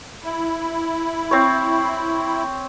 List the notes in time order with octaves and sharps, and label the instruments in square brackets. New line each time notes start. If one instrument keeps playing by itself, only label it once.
[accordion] E4
[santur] C4 C#5